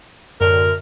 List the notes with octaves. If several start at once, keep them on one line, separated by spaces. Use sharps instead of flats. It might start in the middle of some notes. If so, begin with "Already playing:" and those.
F#2 A2 D3 A#4